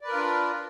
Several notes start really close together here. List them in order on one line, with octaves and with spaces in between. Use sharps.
D5 B4 A#4 F4 D4